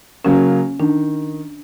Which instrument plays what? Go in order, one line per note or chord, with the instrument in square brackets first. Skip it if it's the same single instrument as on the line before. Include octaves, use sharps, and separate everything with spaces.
[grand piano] C#3 F#3 A#3 [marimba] C#4
[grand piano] D#3 [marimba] D4